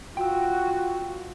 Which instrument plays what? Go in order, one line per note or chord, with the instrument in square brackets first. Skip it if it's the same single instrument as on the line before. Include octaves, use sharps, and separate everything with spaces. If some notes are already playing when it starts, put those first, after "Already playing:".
[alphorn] F4 [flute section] F#4 [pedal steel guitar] G5 E6